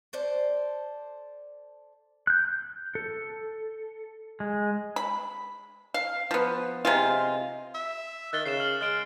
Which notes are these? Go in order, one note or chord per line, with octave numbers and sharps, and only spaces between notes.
A4 C5 D5
F#6 G6
A4
G#3
B5
F5
F3 B3
C3 G#3 F4
E5
D#3 F#6 A6 G7
C#3 C7 E7
F6 F#7
G#3 F6 D7